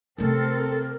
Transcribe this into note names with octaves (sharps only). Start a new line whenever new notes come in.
C3 A3 C4 A4 A#4